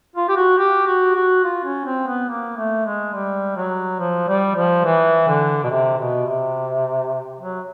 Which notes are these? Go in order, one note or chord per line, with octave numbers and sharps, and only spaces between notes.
F4
G4
F#4
G4
F#4
F#4
F4
C#4
C4
B3
A#3
A3
G#3
G3
F#3
F3
G3
F3
E3
D3
B2
C3
B2
C3
F#3